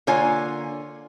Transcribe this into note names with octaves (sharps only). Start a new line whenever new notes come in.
D3 A#3 F4 C#5 G#5